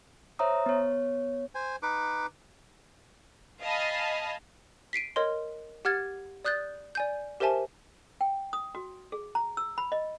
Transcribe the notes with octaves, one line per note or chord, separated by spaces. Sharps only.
C5 C#5 E5 A#5 D#6
B3 C#5
C5 G#5
D#4 B4 D6
D#5 F5 G#5 A5 B5
B6 C7 D7 D#7
A#4 C#5 D#5 C6
G4 F#5 F6 G#6 A6
D5 D#6 F#6 G6 A6
D5 G#5 G6
G4 A#4 C5 E5 G#5 A5
G5
D#6
F#4
G#4
A#5
E6
B5
D#5